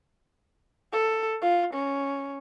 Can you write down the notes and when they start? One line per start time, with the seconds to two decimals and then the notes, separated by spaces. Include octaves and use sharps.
0.93 A4
1.42 F4
1.74 C#4